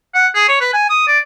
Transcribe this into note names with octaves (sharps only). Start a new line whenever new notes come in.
F#5
G#4
C#5
B4
G#5
D#6
D5